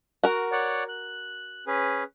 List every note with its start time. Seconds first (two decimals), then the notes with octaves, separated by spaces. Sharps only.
0.24 F#4 A#4
0.52 C#5 D5 F#5
0.89 F#6
1.67 C#4 G#4 B4